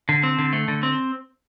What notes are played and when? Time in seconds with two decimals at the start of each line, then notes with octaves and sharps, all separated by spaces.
0.09 D3
0.23 C4
0.39 D3
0.53 A3
0.68 D3
0.83 C4